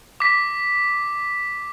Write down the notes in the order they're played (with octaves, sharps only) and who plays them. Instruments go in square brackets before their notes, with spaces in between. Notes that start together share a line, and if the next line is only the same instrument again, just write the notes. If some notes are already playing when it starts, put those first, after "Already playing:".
[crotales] D6 B6